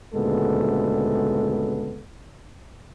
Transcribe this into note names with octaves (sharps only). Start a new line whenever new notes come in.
D2 A#2 C#3 G#3 B3 A4